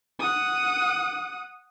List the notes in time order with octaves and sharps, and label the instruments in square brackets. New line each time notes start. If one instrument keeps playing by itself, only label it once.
[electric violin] F#5 D#6